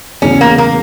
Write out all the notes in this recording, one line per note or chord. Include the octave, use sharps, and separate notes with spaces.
E2 C#3 E3 A3 C#4
A#3
A#3